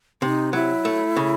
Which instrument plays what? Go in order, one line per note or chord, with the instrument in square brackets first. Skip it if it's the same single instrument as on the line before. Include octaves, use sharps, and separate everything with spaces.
[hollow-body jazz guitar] C3 [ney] D#4
[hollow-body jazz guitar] F#3 [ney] E4
[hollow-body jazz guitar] A3
C#3